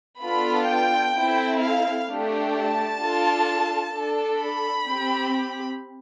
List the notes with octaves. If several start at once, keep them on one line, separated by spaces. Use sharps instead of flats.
B3 D4 F4 A4 B5
G5
C4 E4 A4
F5
A3 D4 G4
A5
D4 F4 A4
D4 A4
B5
C4 G4